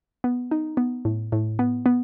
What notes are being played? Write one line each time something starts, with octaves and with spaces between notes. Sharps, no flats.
B3
D#4
B3
A2
A2
B3
B3